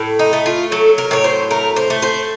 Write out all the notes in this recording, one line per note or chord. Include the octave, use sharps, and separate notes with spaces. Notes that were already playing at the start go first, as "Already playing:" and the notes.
Already playing: A2
D#4
A3
F4
F#3 A4
A#4
A2 C#5
C5
A3 A#4
C5
A3
C5